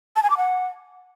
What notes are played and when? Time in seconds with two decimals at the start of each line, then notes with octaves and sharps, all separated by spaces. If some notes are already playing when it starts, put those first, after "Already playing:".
0.16 A5
0.23 G#5
0.30 D6
0.37 F#5